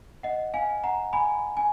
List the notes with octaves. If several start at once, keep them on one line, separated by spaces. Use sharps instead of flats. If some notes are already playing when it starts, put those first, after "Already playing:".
D#5 F#5
F5 G#5
F#5 A#5
G#5 B5
G#5